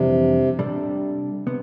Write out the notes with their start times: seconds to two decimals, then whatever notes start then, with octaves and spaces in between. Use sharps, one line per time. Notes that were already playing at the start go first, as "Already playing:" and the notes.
Already playing: F2 C3 E3 G3 B3 D4
0.59 C3 G3 D4 A4
1.47 C3 B3